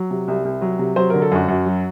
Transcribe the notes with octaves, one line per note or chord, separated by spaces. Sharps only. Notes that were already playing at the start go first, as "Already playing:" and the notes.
Already playing: F#3
C3
C2
C2
F#3
C3
F#3 C5
D3 A#4
A4
F#2 F#4
F#2
F#3